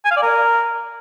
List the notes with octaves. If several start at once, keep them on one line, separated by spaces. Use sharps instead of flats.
G#5
F5
D5
A#4